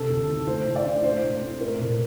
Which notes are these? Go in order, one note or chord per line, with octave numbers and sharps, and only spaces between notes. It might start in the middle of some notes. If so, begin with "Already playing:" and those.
Already playing: C3 D4 A4
D2
D#3
A3 C5
A2
D5
D4
A3 C5
A2
C4
A3 A#4
A#2